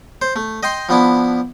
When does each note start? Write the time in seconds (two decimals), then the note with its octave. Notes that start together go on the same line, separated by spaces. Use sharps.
0.22 C5
0.36 A3
0.63 D#5 G5 C6
0.89 F3 B3 D4 E4